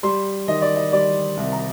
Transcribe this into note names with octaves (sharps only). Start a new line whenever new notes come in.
G3 C6
D#3 D#5
D5
D#5
G3 D5
C2
A#5